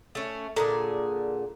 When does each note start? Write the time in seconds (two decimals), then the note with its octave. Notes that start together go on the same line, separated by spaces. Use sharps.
0.15 A3 C#4
0.56 A#2 D3 G#4 A4